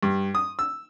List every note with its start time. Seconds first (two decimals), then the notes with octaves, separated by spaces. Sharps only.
0.03 G2
0.35 D#6
0.59 E6